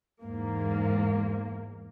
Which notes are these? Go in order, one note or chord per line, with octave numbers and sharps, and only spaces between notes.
E2 G#2 A#3